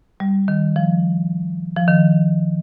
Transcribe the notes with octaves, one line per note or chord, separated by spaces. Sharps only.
G3
D#3
F3
F3
D#3